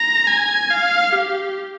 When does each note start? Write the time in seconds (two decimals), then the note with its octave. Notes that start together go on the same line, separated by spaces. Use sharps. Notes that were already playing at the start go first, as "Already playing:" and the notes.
Already playing: A#5
0.28 G#5
0.71 F5
1.13 G4